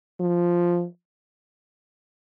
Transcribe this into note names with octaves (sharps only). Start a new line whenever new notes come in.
F3